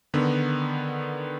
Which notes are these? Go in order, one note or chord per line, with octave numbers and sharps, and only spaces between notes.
D3 D#3 B3